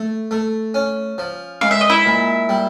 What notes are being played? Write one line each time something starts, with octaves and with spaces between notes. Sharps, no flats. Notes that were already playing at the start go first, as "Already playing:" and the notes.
Already playing: A3
A3
C#4
F3
G#3 F5
E5
D#5
E4 E5
A#2
G3